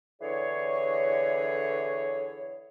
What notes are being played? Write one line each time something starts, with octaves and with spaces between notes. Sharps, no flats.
D3 E3 G#4 C#5